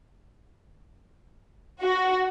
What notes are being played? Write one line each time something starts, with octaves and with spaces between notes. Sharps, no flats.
F#4